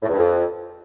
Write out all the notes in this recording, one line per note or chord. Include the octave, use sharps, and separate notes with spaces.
A2
E2
G2
F2